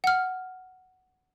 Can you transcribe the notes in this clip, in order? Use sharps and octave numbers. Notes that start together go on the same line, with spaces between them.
F#5 F6